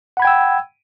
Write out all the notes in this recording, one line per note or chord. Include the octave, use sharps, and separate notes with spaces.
F#5 G5 B5 E6 G#6